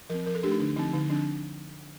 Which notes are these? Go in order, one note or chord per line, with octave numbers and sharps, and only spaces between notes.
F3 C4 A#4
F3 A#4
A4
A3 D4 G4
D#4
D3 D4
F3 C4 D#4
D3 D#4
F3 C4 D4